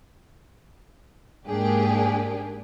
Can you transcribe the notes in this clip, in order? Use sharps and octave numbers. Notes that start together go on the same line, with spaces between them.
G#2 A#3 D4 G4 G#4